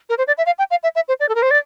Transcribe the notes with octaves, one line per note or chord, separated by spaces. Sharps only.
A#4
C5
D5
E5
F5
G5
F5
E5
E5
C5
D5
A4
A#4
C5
D5